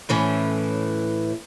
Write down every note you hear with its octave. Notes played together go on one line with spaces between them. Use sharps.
A2 E3 C#4